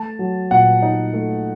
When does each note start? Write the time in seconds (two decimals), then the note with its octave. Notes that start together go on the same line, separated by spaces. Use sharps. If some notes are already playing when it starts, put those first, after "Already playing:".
Already playing: A3 A5
0.19 F#3
0.51 A#2 F#5
0.82 D#4
1.13 A3